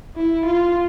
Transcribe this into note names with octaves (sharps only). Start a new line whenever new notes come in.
E4
F4